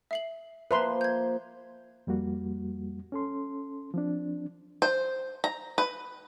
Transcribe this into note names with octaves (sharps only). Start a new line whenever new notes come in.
E5 C7 F#7
F3 A#3 B4 C5 E5 A#5 C6
G6 G#6
F2 G3 A#3 F#4
C#4 A4 C6
F3 C4 D4
C5
A#5
B4